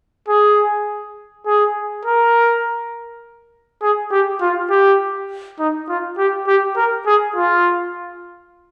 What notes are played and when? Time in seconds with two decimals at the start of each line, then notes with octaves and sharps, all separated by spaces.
0.28 G#4
1.46 G#4
2.05 A#4
3.82 G#4
4.11 G4
4.41 F4
4.70 G4
5.59 D#4
5.89 F4
6.18 G4
6.47 G4
6.76 A#4
7.06 G#4
7.36 F4